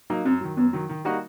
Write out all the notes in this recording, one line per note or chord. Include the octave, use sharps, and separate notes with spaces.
F#3 A#3 D#4
F#2 C4
D#3 F#3
F#2 B3
D#3 F#3
D#3
G3 A#3 D#4 F#4